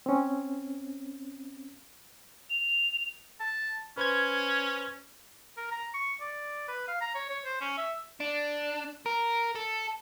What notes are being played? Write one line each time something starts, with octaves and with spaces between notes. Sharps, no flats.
C4 C#4
F7
A5
C#4 B4 C5 G#6
A#4
A#5
C#6
D5
B4
F5
A#5
C#5
C#5
C5
C#4
E5
D4
A#4
A4